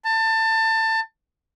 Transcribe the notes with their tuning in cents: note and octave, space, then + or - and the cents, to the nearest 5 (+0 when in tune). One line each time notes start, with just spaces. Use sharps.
A5 +25